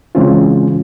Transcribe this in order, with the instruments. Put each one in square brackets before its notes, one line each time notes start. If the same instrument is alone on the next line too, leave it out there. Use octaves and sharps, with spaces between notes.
[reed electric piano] C#3 E3 G#3 C4 C#4 F4